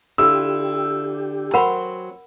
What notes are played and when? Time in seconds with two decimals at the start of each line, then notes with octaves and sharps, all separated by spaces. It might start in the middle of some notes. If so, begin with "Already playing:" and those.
0.18 D3 E4 F4 G4 E6
1.54 F#3 C4 A#4 C5 F#5 B5